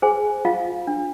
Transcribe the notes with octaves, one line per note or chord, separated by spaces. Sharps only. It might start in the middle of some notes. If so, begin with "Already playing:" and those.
G#4 C5 G#5
F4 F5
D4